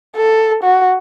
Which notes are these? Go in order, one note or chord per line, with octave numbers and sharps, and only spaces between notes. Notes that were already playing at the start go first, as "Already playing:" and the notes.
A4
F#4